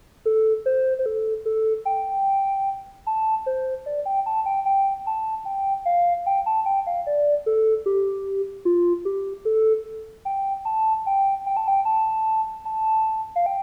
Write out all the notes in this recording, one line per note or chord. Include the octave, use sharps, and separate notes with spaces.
A4
C5
C5
A4
A4
G5
A5
C5
D5
G5
A5
G5
G5
A5
G5
F5
G5
A5
G5
F5
D5
A4
G4
F4
G4
A4
G5
A5
G5
G5
A5
G5
A5
A5
F5
G5